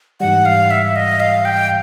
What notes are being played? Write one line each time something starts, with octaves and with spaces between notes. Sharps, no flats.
G#2 E3 G3 F#5
F5
E5
D#5
F5
G5